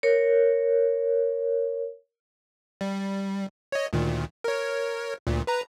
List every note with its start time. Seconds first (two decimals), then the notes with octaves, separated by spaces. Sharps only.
0.03 A#4 C#5
2.81 G3
3.72 C#5 D#5
3.93 D2 A#2 D#3
4.44 A#4 C#5
5.27 D2 A#2
5.47 B4 A#5